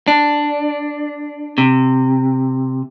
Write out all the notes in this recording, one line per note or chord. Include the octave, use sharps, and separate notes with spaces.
D4
C3